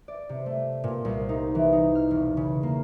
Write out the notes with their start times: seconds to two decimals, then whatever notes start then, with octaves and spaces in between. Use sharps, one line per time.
0.08 D5
0.29 C3
0.46 A3
0.84 A#2
1.05 C2
1.29 D#4
1.55 E3
1.73 D#4
1.95 F6
2.11 E1
2.37 C#3
2.63 A#3